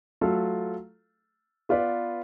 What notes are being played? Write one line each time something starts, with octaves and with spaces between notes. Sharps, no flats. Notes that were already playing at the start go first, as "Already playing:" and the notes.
F#3 A3 F4 A4 F5
B3 F4 B4 D5